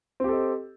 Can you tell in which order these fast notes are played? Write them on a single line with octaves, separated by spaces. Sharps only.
C4 G4 A4 D#5